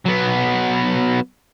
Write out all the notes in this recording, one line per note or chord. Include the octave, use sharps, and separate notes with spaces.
F#3 B3